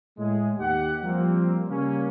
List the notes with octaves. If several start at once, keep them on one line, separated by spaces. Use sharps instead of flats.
A2 G#3 G#4
D#2 G4 F#5
F3 G3 A#3 C4
C#3 G3 A#3 C#4